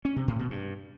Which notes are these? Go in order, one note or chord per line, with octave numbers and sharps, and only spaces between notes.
C#4
C3
A2
B2
G2